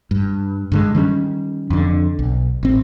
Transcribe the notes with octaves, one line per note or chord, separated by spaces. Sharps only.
G2
G2 D3 G#3
D#3 G3 B3 C#4
F2 D3
B1
A1 C4